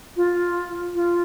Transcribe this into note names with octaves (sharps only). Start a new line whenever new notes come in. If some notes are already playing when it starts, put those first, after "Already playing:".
F4
F4